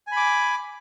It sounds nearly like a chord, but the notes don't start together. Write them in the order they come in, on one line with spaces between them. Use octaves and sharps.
G#5 B5 D6